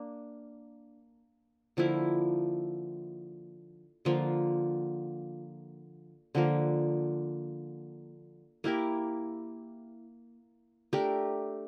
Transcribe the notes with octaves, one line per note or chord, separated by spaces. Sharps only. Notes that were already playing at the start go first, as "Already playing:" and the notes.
Already playing: A#3 D4
D3 F3 A#3 E4
D3 F3 A#3 F4
D3 F3 A#3
A#3 E4 G4 A#4
A3 D4 G4 A#4